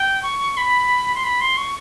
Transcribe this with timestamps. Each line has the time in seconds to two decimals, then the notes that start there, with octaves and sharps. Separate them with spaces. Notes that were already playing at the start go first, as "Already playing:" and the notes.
Already playing: G5
0.23 C#6
0.57 B5
1.15 C6
1.24 B5
1.41 C6
1.57 C#6